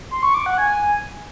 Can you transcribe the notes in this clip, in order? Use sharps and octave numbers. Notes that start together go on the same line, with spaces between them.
C6
C#6
D6
F#5
G#5